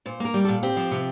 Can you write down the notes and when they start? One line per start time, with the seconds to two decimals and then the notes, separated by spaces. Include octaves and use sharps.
0.06 A#2 C5
0.20 A#3 A#4
0.34 G3
0.45 A#2 A4
0.63 C4 G4
0.77 F3
0.91 C3